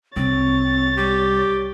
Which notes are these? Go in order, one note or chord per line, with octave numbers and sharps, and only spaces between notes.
C2 C4 C#5 A6
G3 G4